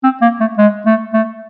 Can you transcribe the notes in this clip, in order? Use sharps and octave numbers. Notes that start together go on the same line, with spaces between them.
C4
A#3
A3
G#3
A3
A3